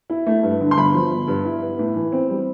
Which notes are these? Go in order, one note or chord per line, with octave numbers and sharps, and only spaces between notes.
E4
A3
G2
D3
C6
G1 B5
F3
G1
G2
E4
B3
A2
E3
C4
G3